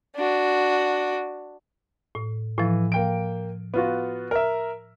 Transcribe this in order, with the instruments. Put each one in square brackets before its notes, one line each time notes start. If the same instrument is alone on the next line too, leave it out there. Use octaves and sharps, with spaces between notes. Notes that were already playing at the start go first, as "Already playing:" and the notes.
[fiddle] D4 F#4
[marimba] A2
[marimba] A2 F3 [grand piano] E3
[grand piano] A#3 G5 D7
B3 F4 F#4
A#4 E5